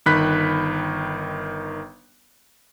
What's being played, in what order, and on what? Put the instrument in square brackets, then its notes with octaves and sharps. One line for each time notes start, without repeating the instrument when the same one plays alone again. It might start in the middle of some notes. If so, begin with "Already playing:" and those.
[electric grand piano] G1 D#3 B5 F#6 B6